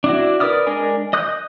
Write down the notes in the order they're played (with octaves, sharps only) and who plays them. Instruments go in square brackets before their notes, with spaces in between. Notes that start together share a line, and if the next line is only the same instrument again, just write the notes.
[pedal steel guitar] D4 E4 F#4
A#4 B4 D5 D#6 F6
G#3 D4 A#4 G#5
D#5 D#6 F#6 G6